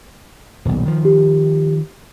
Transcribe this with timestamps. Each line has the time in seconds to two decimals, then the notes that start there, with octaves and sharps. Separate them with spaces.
0.65 D#1 B1
0.86 D#3 F3
1.05 G4